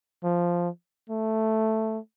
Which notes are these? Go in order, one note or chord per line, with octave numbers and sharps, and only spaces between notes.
F3
A3